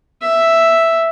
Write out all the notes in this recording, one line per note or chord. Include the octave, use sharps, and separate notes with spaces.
E5